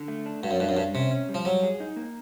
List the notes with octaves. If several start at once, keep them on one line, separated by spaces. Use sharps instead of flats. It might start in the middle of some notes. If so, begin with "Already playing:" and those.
Already playing: D3
A3
D4
G2 F#4
F#2
G2 D4
F#2
G2 G3
C3 C#4
C#4
G3
F3
F#3 G3
G#4
D#4
A#3